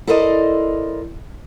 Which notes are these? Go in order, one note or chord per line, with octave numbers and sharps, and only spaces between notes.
E4 A4 A#4 C5 D5 D#5